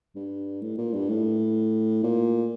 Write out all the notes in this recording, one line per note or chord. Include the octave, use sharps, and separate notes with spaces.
G2
A2
A#2
G2
A2
A#2